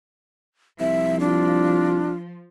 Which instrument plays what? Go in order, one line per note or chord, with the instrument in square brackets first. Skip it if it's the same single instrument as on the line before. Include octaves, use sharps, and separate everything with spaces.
[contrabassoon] C2 [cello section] F3 [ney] E5
[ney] D4 [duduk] F4